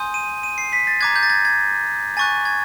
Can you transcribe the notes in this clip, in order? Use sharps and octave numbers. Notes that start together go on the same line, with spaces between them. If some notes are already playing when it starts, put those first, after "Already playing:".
Already playing: G#5 C6 D#6 G6
D#7
D#7
C7
B6
A6
A#5 D6 F#6 G#6
G6
A6
G#6
G#6
G#5 C#6 F#6 A6
G#6